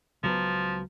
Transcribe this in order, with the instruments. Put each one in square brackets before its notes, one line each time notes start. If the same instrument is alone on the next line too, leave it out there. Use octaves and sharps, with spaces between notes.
[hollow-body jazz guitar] C#2 F#3 B3 [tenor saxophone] F3